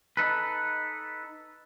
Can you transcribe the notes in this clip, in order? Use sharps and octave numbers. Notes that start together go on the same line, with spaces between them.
D#4 A4 B4